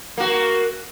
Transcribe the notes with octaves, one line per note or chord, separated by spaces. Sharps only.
A#3 F#4